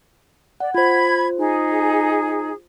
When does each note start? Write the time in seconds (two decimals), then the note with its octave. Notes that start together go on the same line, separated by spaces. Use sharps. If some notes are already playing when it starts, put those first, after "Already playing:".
0.60 D5 F#5
0.74 F4 C5 B5 G#6
1.37 D#4 G#4